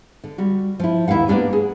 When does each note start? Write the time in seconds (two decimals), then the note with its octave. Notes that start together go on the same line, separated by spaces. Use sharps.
0.24 D3
0.38 G3 F#4
0.80 F3 E4
1.08 D#2 E4 G4 F5 F#5
1.28 A#3 B3 C#4 D4 G4
1.53 G#4